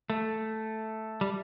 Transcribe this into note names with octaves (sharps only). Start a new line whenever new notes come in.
A3
G3